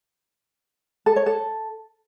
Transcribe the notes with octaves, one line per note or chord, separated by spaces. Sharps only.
A4
C#5
A4